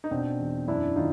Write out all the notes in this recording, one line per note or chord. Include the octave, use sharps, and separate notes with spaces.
D#4
B2 C4 D4
E2
F#2 D4 E4
D#3 D#4 F4